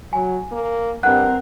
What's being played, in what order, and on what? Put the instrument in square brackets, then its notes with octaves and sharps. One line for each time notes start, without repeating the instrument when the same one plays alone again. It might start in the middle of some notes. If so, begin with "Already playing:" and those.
[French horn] F#3 [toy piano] G#5
[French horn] A#3
[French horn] G2 [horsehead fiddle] C4 A#4 [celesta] F#5 F#6